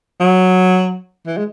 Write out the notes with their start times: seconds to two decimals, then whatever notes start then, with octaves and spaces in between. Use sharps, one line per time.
0.20 F#3
1.26 E3
1.37 G#3